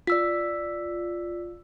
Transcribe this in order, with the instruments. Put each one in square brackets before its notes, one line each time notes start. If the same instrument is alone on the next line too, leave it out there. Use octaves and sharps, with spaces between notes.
[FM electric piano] F4 [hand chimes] D5 E6 B6